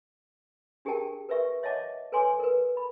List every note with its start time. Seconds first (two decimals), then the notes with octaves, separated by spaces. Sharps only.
0.85 D4 G4 G#4 A#4 G5 A5
1.29 A#4 B4 D5 E5 C#6
1.63 C#5 D#5 E5 F#5 A5 D6
2.12 A4 B4 C#5 G#5 C6 D6
2.40 A#4 B4
2.77 B5